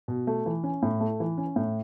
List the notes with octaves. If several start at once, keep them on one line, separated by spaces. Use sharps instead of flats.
B2
A3
E3
C#4
A2
A3
E3
C#4
A2